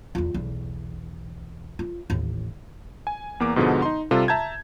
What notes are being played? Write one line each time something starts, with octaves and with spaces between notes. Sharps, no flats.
E2 F4
B1 E2
F4
A1 D#2
G#5
E2 A#3 D6
G#2 B2 D3 F3 G#3 B3
D#4 C6
C3 G3 F4 A4
E5 A5 A#5 G6 G#6